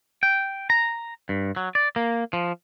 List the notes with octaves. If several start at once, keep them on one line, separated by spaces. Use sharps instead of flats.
G5
A#5
G2
F#3
D5
A#3
F3